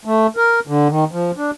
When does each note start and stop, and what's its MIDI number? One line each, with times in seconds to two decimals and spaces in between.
0.05 0.27 57
0.37 0.60 70
0.67 0.88 50
0.89 1.05 51
1.12 1.31 53
1.37 1.51 62